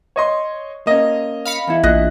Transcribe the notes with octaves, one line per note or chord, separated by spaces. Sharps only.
C#5 D#5 C6
A#3 C#4 D#5
F5 B5 C#7
E2 E4
A#1 D#5 F#6 A#6